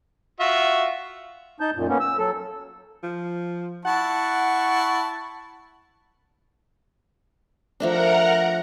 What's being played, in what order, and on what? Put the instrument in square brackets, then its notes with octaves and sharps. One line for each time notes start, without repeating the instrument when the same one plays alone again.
[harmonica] F4 F#4 E5
[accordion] D#4 A5 G6
F#2 A#2
A#3 B3 C#4
E6
F#3 A4
[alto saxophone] F3
[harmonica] E4 A5 C#6 [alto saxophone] F#5
[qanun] F3 A3 D4 [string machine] A#4 F#5 A#5